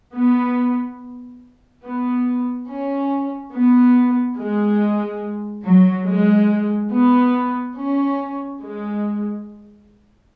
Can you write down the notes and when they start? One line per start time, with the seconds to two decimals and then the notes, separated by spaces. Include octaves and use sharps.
0.13 B3
1.83 B3
2.68 C#4
3.52 B3
4.37 G#3
5.64 F#3
6.06 G#3
6.91 B3
7.76 C#4
8.60 G#3